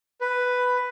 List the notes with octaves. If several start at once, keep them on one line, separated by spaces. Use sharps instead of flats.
B4